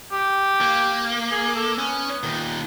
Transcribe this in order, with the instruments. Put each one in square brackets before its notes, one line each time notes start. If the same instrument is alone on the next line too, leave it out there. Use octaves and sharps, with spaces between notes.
[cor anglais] G4
[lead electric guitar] A#3
[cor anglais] G#4
A4
[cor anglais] B3 [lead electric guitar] C#4
[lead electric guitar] A#2 D#3